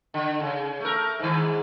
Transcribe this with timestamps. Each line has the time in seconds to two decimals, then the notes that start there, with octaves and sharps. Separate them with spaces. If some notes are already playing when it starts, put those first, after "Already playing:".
0.14 D3
0.40 C#3
0.80 A3 A#4
1.19 G#2 D#3